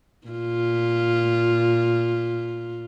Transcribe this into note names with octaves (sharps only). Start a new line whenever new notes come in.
A#2 F4